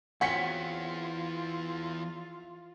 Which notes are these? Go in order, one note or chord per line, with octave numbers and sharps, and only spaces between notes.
E2 F#3 C4 C#4 F4 F#5 B6 C#7